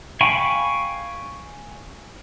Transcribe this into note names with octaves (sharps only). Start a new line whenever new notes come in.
F5 G5 G#5 B5 C#6